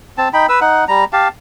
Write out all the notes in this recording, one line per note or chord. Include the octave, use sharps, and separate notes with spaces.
C4 A5
D#4 G5 B5
B4 E6
D#4 F#5
G3 A#5
G4 F5 A5